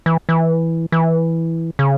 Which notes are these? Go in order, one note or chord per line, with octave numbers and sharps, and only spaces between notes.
E3
E3
E3
C#3